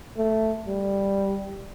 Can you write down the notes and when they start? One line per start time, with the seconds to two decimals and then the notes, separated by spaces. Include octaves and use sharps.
0.17 A3
0.67 G3